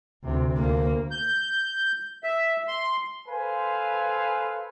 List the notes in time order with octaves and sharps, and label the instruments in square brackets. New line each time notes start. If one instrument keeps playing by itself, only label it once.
[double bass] D2 C3
[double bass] D2 [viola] A#3
[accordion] G6
E5
C6
[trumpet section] A4 B4 C5 F5 G#5